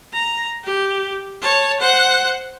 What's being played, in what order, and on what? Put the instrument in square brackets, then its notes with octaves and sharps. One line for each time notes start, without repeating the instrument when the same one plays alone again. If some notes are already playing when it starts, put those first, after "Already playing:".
[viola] A#5
G4
C#5 A5
C5 F#5